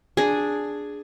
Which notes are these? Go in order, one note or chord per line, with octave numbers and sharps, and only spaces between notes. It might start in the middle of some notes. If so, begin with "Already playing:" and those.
D4 G#4